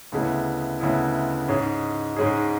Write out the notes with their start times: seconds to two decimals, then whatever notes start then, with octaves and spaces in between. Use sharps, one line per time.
0.12 D2 C#3 G#3 B3 E4
0.80 D2 C#3 G#3 B3 E4
1.48 G#2 G#3 C#4 G#4
2.16 G#2 G#3 C#4 G#4